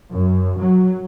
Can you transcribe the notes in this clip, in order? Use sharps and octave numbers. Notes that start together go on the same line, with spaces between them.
F#2
F#3